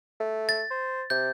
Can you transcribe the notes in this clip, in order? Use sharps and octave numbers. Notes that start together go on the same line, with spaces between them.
A3
A6
C5
C3 G6